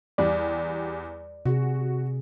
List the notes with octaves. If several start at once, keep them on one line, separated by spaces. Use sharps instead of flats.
E2 G3 D5
C3 F#4 G#4